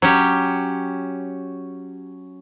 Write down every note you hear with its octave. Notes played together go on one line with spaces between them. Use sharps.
F#3 C#4 G4